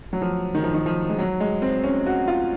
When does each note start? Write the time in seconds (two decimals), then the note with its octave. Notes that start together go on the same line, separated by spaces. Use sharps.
0.13 F#3
0.22 F3
0.55 D#3
0.64 F3
0.74 D#3
0.86 F3
1.09 G#3
1.18 F#3
1.40 G#3
1.62 C4
1.84 C#4
2.06 F#4
2.27 F4